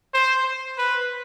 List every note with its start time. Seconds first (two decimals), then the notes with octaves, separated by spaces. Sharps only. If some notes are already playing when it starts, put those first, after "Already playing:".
0.14 C5
0.78 B4